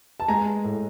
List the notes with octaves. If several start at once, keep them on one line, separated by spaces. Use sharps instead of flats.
A5
G#3 G#5 A#5
A2